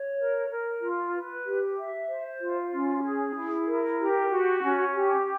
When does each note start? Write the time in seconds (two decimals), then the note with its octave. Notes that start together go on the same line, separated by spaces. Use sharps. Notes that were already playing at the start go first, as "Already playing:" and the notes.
Already playing: C#5
0.18 A#4
0.50 A#4
0.81 F4
1.13 B4
1.45 G4
1.77 E5
2.08 C5
2.41 F4
2.72 C#4
3.03 G#4
3.35 E4
3.68 A#4
3.99 G4
4.31 F#4
4.62 C#4
4.95 G4